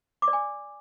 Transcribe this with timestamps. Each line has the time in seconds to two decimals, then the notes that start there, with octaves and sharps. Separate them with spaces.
0.22 D6
0.28 D5
0.33 G#5